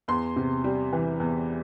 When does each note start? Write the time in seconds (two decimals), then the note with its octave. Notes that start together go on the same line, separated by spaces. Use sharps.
0.08 E2 C6
0.36 C3
0.64 G3
0.93 E3
1.20 E2